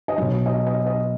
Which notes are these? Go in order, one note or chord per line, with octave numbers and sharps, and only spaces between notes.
D#5
B2 F#3 C#5
D#5
D#5
D#5